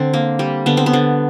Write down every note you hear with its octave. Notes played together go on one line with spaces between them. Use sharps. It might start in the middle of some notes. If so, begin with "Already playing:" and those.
Already playing: D3 C4
A#3
G3
D3 B3
C4
B3
D3